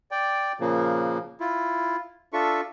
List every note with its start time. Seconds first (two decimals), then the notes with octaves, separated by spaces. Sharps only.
0.11 D5 G5
0.60 A#2 C#3 F3 A#3
1.40 E4 F4
2.33 D4 F4 A4 E5 C#6